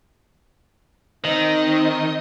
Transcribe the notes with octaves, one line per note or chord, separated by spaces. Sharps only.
D#3 C4 D#4 D#5